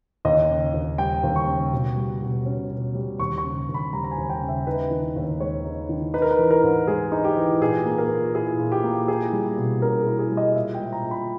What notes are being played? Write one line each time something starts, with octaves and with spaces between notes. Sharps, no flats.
D#2 D#5
C#3
D#2
G3 G5
D#2
C#6
C#3
B2
G3
B2
C#4
B2
G3
D#2 C#6
C#6
C#3
D#2
B5
G3 A#5
A#5
G#5
D#2
G5
C#3
E5
D#4 B4
D#3
D#2
G#3 C#5
D#4
D#3
D#4 B4
A#4
B4
E3
A#4
G#2
G#3 G#4
D#4
G4
E3
A#2 G#4
A#3
A#4
A#2
E4 G#4
A#2
G4
A#3
E4 G#4
G3
B2
C#4 A#4
G#4
E4
G#4
G3
D#5
A#2 E5
G5
G#3
A#5
A#2
B5